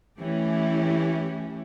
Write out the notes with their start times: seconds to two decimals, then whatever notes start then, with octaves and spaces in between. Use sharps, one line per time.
0.19 E3 A3 C#4 E4 G4